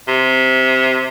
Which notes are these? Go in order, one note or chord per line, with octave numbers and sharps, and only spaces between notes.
C3